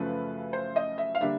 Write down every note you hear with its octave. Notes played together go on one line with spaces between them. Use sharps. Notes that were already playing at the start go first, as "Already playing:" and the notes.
Already playing: F#2 C#3 F3 A3 B4
C5
D#5
E5
F5
D3 G3 A#3 D4 E5